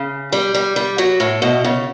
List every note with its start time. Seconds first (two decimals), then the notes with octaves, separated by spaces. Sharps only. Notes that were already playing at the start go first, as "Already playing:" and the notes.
Already playing: C#3
0.32 G3
0.54 G3
0.76 G3
0.98 F#3
1.20 A2
1.42 B2
1.64 C#3